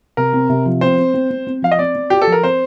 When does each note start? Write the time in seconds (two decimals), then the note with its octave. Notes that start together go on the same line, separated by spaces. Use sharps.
0.17 C3 A#4
0.33 C4
0.49 C3
0.66 F3
0.81 C4 C5
0.97 C4
1.14 C4
1.30 C4
1.47 C4
1.62 F3 F5
1.71 D#5
1.79 C4 D5
1.95 C4
2.10 F4 G4
2.22 A4
2.27 F3
2.32 A#4
2.43 C4 C5